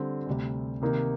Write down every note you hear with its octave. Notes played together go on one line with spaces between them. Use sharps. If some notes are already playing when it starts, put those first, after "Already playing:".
Already playing: D3 G3 C4
D2 C3 G3
C3 D#3 A#3 D#4